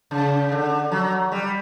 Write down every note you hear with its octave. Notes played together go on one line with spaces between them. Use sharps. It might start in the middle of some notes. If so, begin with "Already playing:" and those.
C#3
D3
F#3
G3